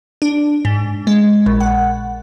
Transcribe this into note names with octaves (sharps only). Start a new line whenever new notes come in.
D4
G#2
G#3
A#1
F#5